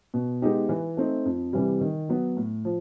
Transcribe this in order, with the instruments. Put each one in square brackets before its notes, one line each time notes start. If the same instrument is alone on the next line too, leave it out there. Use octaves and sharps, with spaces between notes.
[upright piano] B2
G#3 B3 D#4 G4
E3
A3 C4 D#4
F2
C3 E3 G3
D#3
F#3 B3
A2
F3